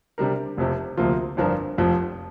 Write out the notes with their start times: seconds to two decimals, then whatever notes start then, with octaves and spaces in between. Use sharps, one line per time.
0.18 C3 G3 D4 A#4
0.57 F1 F2 C3
0.97 D2 C3 F3 A#3 F4
1.37 G1 F2 F3 D4 A#4
1.78 F1 F2 F3